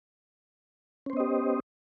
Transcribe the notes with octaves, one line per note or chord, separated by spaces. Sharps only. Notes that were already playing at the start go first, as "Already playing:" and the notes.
B3 C#4 G4 C5 D#5